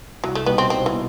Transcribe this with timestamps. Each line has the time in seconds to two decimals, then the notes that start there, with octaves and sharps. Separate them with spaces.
0.23 C2 F#3
0.35 A3
0.46 B2 G3 B3 D#4
0.58 C4
0.70 C2 C4
0.86 E3
0.93 B2